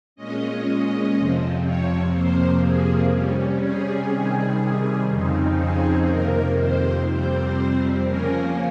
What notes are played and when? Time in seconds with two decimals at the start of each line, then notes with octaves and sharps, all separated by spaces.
0.16 A#2 G#3 C#4 D#5
1.15 F2 C3 F3 C4
1.64 C#5
2.13 F2 C3 F3 A#3 C5
2.62 G#4
3.11 C3 G3 C#4
3.61 G#4
4.10 C3 D#3 G3
5.08 F2 C#3 F3 C4 D#4
5.57 G#4
6.07 F2 C3 D#3 A#3 A#4
6.56 C5
7.05 F2 C3 G3 C4 C5
8.04 C#3 F3 A#3 C#4 A#4